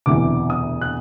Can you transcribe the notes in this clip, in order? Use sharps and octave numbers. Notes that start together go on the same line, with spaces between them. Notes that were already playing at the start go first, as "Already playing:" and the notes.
E1 D2 C3 E3 D6
D#6
F#6